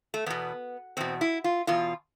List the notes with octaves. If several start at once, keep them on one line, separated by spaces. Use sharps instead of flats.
A3
E2 B2 B3
E2 B2 C4
E4
F4
E2 B2 F4